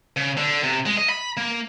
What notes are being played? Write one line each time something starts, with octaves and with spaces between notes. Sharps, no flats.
C#3
D3
C3
G#3
D#5
B5
A#3